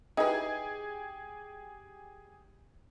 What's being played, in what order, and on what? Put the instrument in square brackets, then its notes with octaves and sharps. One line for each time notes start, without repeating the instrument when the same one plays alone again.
[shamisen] D#4 E4 B4 [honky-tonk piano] G4 G#4